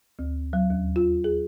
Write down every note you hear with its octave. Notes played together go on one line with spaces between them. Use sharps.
D2
F#3
D#2
F4
G#4